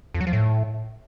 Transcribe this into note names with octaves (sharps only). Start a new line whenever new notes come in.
F2
F#3
F3
A2